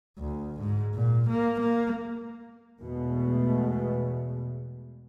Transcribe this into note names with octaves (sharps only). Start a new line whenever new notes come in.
D2
G#2
A#2
A#3
A#3
E2 B2 G#3 A3